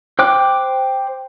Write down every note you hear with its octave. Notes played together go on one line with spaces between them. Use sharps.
C5 G5 D6 F#6